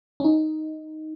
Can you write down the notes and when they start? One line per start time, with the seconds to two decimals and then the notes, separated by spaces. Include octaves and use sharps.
0.20 C#4
0.24 D#4